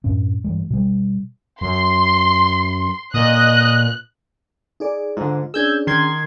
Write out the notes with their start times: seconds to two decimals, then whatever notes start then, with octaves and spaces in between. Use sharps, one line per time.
0.04 F#2 A2 C#4
0.44 G2 E3 G#3
0.70 B2 G3
1.61 F#2 C6
3.14 A#2 D#5 F#6
4.80 D#4 G#4 D5
5.17 G#2 D3 F4
5.54 C#4 D4 G#4 E6 G6 G#6
5.87 D#3 C6 G#6